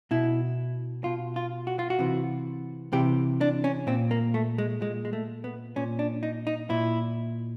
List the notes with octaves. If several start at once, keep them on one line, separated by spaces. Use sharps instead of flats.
B2 E4
B2 F4
F4
F#4
F4
F#4
C3 E3
C3 E3 G4
D4
C#4
A#2 C4
A#3
A3
G#3
A#2 G#3
G#3
A3
B3
A#2 C#4
D4
D#4
D#4
A#2 E4